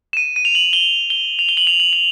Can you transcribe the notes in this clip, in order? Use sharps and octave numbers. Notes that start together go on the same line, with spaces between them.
E7
D#7
D#7
F7
F#7
G7
G7
F7
G7
F#7
F7
F#7
F#7